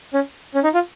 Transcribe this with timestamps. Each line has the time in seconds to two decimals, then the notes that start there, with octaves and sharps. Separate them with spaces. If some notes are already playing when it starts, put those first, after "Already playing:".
0.14 C#4
0.55 C#4
0.64 D#4
0.74 F4